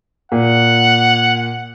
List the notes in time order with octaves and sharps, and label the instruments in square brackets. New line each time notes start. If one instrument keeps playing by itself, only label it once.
[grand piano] A#2 [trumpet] F#5